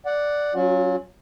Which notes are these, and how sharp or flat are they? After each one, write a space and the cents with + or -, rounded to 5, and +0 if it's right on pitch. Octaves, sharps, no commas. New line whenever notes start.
D5 +0 F#5 +0
F#3 +0 C#4 +0 F4 +40